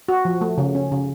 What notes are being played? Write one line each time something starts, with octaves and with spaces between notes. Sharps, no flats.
F#4
F3
A3
C#3
C#4
C#3